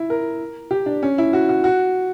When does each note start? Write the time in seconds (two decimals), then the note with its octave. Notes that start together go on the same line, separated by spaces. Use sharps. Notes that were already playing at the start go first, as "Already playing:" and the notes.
Already playing: E4
0.10 A#4
0.71 G4
0.86 D4
1.03 C#4
1.18 E4
1.33 F#4
1.49 F#4
1.64 F#4